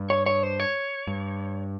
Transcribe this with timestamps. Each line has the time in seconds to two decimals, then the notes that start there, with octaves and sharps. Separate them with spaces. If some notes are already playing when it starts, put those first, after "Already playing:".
Already playing: G2
0.10 C#5
0.26 C#5
0.43 C5
0.60 C#5
1.07 G2